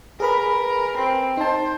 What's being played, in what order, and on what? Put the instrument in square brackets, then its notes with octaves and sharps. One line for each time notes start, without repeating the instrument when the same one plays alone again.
[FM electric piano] G#4 B4 B5 [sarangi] A#4
[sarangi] C4
[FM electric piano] D#4 A5 [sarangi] C5